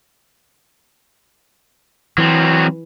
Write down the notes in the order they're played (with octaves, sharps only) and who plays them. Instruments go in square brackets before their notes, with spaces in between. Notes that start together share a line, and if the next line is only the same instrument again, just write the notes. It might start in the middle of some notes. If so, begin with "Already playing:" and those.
[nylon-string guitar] E3 [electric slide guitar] F#3 C4